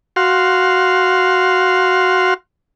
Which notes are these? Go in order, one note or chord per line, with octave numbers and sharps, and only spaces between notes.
F#4 F5 C6